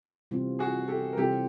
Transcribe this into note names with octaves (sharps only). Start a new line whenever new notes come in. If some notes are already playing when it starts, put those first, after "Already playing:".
C3 E3 G3 C4 F4
F#4 G#4
G4 A4
A#4
C3 E3 G3 C4 F4 G4 A4